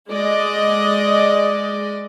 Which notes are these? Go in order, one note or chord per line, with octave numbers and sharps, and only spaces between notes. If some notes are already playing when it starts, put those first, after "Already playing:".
G#3 D5 D#5